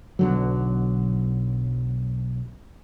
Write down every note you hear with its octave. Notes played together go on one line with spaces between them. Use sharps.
B1 D3 F#3